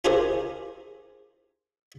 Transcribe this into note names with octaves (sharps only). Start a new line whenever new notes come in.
F4 G4 G#4 A#4 C5 E5